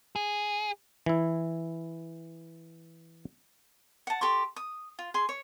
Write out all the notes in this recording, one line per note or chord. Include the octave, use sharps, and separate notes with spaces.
G#4
E3 E4
F#5 A5
G4 A4 C6 C#6
D#6
F4
G#4 C6
C#5